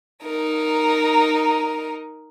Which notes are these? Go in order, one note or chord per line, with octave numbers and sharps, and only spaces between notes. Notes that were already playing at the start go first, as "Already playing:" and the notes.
D#4 A#4